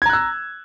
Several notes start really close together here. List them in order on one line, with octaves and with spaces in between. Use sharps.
G#6 A#5 F#6 E6